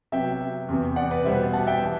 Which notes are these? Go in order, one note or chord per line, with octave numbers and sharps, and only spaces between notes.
C3 F#3 B3 E5 G5
E2 C3 E3
D5 F#5
B4 D5
B2 G3 B3 C5 E5
F#5 A5
E5 G5
E3